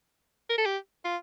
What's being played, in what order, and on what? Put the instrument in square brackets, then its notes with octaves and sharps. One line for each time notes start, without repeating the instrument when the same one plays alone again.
[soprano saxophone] A#4
A4
G4
F4